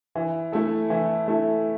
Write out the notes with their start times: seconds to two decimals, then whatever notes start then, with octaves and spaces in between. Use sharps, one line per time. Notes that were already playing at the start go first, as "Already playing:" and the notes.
0.15 E3
0.52 A3 E4 A4
0.90 E3
1.28 A3 E4 A4